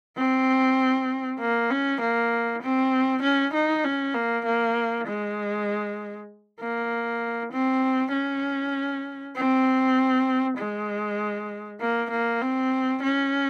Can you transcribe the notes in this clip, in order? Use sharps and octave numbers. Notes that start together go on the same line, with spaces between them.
C4
A#3
C#4
A#3
C4
C#4
D#4
C#4
A#3
A#3
G#3
A#3
C4
C#4
C4
G#3
A#3
A#3
C4
C#4